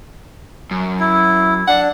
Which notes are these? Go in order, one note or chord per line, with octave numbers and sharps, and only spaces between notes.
F#2
E4
D4 F#5